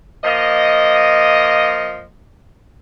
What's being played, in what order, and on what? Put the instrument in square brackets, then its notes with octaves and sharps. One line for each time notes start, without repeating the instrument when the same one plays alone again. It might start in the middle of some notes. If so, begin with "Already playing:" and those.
[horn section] F3 A#3 D#5